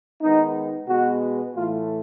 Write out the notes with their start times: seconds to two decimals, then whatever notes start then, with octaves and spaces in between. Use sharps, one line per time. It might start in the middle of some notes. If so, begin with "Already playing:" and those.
0.22 D#3 G#3 B3 D#4
0.88 B2 G#3 B3 F#4
1.55 A2 E3 A3 F4